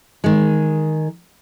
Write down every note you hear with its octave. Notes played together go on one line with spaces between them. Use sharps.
D#3 G#3